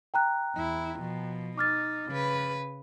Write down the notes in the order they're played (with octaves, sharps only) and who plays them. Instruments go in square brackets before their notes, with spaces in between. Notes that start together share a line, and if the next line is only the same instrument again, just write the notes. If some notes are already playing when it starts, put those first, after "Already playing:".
[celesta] G5 A#5 F#6
[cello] E2 E4
B2 F3
[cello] D#4 [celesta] D6 F6 A6
[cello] C#3 B4